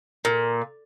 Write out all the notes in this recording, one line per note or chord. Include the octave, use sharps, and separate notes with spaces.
A#2